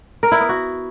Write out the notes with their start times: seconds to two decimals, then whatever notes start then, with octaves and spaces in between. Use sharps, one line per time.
0.23 A#4
0.32 E4
0.40 B3
0.49 F#4